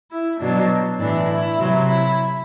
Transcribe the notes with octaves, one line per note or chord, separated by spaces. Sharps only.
E4
B2 F#3 D4
A2 E3 D4
E4
C3 F#3
E4